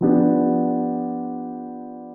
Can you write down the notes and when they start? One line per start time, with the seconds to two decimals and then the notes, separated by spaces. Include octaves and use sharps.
0.01 F3 B3 D4 G4